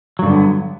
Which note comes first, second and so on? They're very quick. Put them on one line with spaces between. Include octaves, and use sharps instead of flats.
F#3 G2 D3 B3